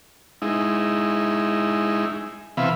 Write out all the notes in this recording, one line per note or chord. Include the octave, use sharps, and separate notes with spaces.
G#3 D#4 E4
C3 E3 B3 E5 F5 B5